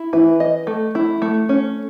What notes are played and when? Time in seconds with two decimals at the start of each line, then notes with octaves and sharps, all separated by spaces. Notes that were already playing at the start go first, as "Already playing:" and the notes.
Already playing: E4
0.13 E3 B4
0.40 D#5
0.67 A3
0.95 E4
1.22 A3
1.49 C#4